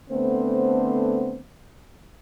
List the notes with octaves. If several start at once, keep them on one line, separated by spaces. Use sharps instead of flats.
D3 A3 B3 C4 C5